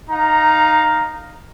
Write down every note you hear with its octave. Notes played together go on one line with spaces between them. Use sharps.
D#4 F5 A#5